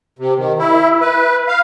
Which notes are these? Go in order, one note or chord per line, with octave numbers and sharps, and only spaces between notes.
C3
D#3
E4
B4
F5